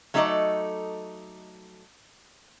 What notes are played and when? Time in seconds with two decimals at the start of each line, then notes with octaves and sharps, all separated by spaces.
0.14 F#3 A3 D#4 A4 D5 D#5